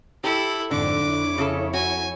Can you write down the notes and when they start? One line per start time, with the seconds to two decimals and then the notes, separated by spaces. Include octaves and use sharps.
0.24 E4 G4 A4
0.71 F2 G#2 D3 D6
1.05 F2 E4 C#5
1.38 C#3 G#4 A4
1.73 F#4 G#5